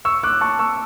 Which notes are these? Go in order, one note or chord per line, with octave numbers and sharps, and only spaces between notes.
C#6 E6
D6 F#6
A5 C#6
C#6 E6